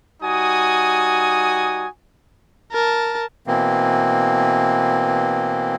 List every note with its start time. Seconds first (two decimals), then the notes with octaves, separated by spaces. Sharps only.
0.22 G3 D#4 F#4 G#5 D#6
2.72 A#4 A5
3.47 B2 E3 A#3 C4